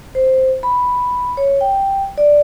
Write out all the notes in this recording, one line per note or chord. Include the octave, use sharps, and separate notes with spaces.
C5
B5
C#5
G5
D5